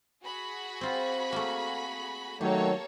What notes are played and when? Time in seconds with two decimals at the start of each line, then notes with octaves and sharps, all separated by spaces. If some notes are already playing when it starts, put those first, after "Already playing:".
0.23 F#4 G#4 B5
0.81 C4 F4
1.32 A3 A#3
2.41 D#3 F#3 A3 A#3 G4 A4 C#5